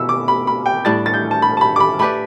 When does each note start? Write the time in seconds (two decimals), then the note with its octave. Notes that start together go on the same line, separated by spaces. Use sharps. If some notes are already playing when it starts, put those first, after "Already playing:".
Already playing: B2 B3 E4 E6
0.09 D6
0.28 B5
0.47 B5
0.66 G5
0.85 A2 G3 D4 A6
1.06 A6
1.14 G6
1.31 A5
1.42 B5
1.57 A5
1.61 B5
1.76 D6
1.80 B5
1.99 A3 G4 B4 D5 B5